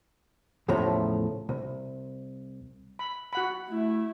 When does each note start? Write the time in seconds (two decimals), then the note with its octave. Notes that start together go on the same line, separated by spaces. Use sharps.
0.68 E2 A2 C#3 F3 A3 A#5
1.49 C2
2.99 B5
3.33 F#4 F#5 B5
3.69 A3 E4